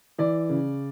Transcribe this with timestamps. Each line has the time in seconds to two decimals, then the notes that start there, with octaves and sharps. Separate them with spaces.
0.18 E3 D5
0.49 C#3